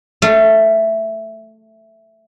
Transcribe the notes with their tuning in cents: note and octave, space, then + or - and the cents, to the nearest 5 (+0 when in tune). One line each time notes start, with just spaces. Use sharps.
A3 +5 F5 -35